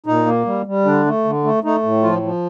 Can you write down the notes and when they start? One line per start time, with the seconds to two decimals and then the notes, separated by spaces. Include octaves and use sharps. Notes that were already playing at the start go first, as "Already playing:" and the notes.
0.06 A#2 D#4
0.26 A#3
0.46 G3
0.66 G3
0.85 D3 D4
1.06 A3
1.25 D3
1.44 A3
1.64 A3 D#4
1.83 A2
2.03 F3 F4
2.22 F3